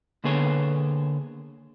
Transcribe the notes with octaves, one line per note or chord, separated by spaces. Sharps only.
D3 A#3 B3 G#4 A4 C#5